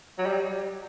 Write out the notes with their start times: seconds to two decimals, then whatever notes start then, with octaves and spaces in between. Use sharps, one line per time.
0.18 F#3
0.26 G3